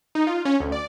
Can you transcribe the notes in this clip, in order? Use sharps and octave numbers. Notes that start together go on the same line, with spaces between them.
D#4
F4
C#4
D2
D5